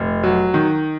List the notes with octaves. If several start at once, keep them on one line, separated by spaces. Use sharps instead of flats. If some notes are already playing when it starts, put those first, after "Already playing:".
Already playing: F1
F#3
D#3